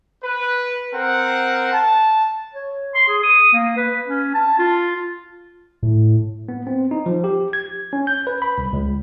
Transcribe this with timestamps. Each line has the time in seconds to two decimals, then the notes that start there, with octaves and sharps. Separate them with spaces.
0.24 B4
0.94 C4 A#4 F#5
1.73 A5
2.54 C#5
2.95 C6
3.08 G#4
3.23 D#6
3.53 A#3
3.77 B4
4.06 C#4
4.34 A5
4.59 F4
5.83 A2
6.49 B3
6.67 C4
6.91 D#4
7.06 F3
7.24 G4
7.53 G#6
7.93 C#4
8.07 G6
8.27 B4
8.42 B5
8.58 C2
8.73 C#2